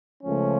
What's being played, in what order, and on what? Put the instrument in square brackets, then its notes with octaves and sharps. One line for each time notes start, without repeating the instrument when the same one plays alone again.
[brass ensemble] C#2 C#3 F3 A3 C#4